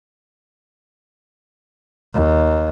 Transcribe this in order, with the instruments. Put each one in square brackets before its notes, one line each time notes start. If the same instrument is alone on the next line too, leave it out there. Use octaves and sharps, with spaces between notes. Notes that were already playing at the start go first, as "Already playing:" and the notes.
[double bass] D#2